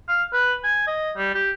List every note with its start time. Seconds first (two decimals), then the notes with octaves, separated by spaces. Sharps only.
0.09 F5
0.33 B4
0.64 G#5
0.87 D#5
1.17 G3
1.34 G4